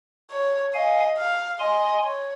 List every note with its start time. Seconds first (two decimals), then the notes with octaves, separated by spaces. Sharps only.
0.31 C#5
0.74 D#5 F5 G#5
1.17 F5
1.59 D#5 G#5 C6
2.03 C#5